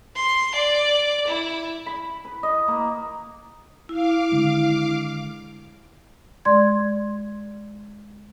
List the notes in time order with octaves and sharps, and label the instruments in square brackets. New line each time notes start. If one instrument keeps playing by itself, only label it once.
[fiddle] C6
D5
E4
[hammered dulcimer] B5
B4
D#5
A#3
[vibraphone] E4 [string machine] F5 D6
[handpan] D3 D#3 G#3
[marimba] G#3 D5 C6 G#6